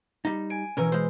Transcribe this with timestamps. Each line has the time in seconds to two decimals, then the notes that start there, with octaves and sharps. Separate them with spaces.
0.25 G3 D#4
0.50 G#5 D7
0.77 B2 E3 C#4 A#4
0.92 G#3 C5